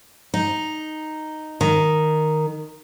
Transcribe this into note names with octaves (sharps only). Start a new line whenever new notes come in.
D#4
D#3